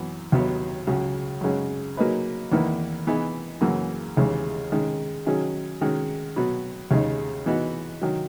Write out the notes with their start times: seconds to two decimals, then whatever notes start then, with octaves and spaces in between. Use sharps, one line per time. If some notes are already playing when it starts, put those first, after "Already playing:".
Already playing: F#2 E3 B3
0.32 D#2 D#3 F#3 B3
0.87 C#2 C#3 F#3
1.41 F#2 C#3 G#3 C#4
1.97 F#3 A#3 D#4 G#4 B4
2.52 E2 D#3 A#3 E4 B4
3.07 E3 B3 D#4 G#4
3.61 F#2 C#3 E3 A#3
4.17 D#2 C#3 E3 G#3 D#4
4.72 D#3 G#3 C#4
5.26 D#3 F#3 C#4 G#4
5.81 D#3 G#3 C#4 F#4
6.36 B2 F#3 B3 F#4
6.91 D#2 C#3 G#3 D#4
7.46 E3 B3 D#4 F#4
8.02 D#3 F#3